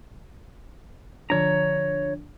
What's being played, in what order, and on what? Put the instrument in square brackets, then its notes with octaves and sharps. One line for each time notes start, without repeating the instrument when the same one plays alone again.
[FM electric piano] D3 F3 D4 [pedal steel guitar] C#5 A#5